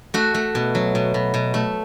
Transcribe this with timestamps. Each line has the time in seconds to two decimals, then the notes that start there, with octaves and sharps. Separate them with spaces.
0.14 A3 F#4
0.34 A3
0.55 B2
0.75 F#3
0.95 B2
1.14 B2
1.34 B2
1.54 A3